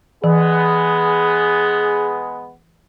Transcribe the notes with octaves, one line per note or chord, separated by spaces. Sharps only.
E3 G#3 B3 G#4